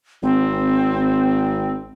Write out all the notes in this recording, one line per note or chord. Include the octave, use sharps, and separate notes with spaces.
G#1 C4